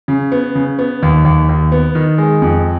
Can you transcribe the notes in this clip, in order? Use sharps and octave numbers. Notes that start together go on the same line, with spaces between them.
C#3
B3
C#3
B3
D#2
D#2
D#2
B3
D#3
G#3
F2